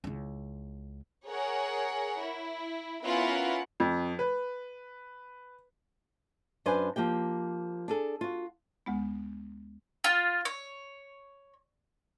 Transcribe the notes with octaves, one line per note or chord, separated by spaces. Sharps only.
C#2 E4
G#4 A#4 C#5 F#5
E4
B3 C#4 E4 F4 A#4 F#5
F2
B4
F#2 D4 B4 C5 G#5
F3 A#3 G4 G5
D4 G#4 A4
F4 F#4
D2 G#3 B3
F4
C#5